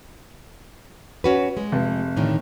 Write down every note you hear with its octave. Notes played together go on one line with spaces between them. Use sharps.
C#4 F#4 B4
G#3
F1
A2 D3 D#3